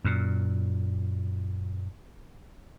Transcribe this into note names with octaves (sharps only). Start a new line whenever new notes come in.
F#2 A#2